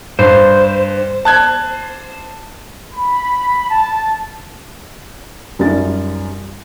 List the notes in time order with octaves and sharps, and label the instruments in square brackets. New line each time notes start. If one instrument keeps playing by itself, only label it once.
[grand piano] G2 [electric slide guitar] C5
[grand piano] A5 F#6 G#6
[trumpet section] B5
A5
[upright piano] F#2 G3 C#4 D#4 F4 A6